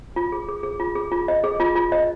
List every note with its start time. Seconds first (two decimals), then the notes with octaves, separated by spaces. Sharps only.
0.16 F4
0.32 G#4
0.48 G#4
0.63 G#4
0.80 F4
0.95 G#4
1.12 F4
1.28 D#5
1.44 G#4
1.60 F4
1.75 F4
1.92 D#5